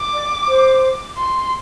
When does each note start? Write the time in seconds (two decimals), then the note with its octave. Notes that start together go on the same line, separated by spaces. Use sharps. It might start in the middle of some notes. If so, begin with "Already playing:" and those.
Already playing: D6
0.13 D5
0.48 C5
1.17 C6